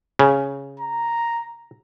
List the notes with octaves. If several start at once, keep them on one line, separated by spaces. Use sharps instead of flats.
C#3
A#5